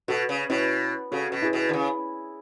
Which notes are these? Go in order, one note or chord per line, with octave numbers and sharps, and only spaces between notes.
B2 F#4 A4
C#3
B2 C#4 E4
C#3 F#4 A4
B2
E4 G#4
B2
D3
C#3